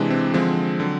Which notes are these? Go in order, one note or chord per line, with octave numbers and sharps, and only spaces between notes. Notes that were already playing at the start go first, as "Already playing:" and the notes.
Already playing: C3 E3 G#3 D4
C4
D3 F3 G#3 C4
D3 F#3